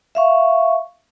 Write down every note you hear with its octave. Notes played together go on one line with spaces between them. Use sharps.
E5 F5 C#6